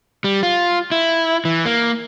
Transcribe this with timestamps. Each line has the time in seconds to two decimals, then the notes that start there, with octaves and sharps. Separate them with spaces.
0.24 G3
0.43 F4
0.92 E4
1.45 E3
1.66 A#3